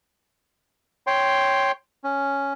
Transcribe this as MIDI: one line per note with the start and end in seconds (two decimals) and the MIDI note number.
1.07 1.72 73
1.07 1.72 79
1.07 1.72 84
2.04 2.53 61